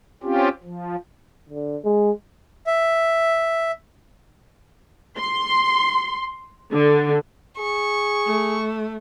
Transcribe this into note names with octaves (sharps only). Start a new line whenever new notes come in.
C4 C#4 F4 G4
F3
D3
G#3
E5
C6
D3
G#4 C#6
A3